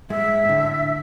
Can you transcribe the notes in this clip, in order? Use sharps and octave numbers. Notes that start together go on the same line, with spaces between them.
G#2 G#3 E5
A2 D3